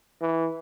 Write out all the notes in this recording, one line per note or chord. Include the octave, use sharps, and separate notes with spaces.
E3